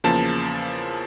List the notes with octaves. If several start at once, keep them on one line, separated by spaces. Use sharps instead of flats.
E2 C#3 F3 A#3 A5